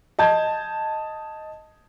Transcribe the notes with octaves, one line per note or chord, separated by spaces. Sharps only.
D#5 A5 G6 G#6